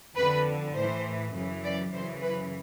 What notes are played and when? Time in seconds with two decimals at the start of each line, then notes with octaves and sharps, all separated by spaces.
0.16 F2 D3 B4
0.74 A2 E3 C5
1.33 F#2 C#3 E3
1.64 D5
1.93 F#2 C#3 E3 C5
2.23 B4